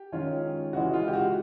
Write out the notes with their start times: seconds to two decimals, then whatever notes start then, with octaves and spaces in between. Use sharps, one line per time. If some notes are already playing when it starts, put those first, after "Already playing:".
Already playing: G4
0.12 D#3 G#3 C#4 F4
0.73 C#3 E3 G#3 F#4
0.93 F4
1.08 G4
1.13 F#4